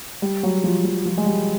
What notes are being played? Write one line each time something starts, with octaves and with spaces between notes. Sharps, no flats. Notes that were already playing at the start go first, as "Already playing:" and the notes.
G3
F#3
F3
F3
F3
G#3
G3